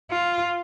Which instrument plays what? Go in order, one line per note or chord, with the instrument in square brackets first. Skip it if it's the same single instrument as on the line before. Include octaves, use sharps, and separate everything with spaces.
[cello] F4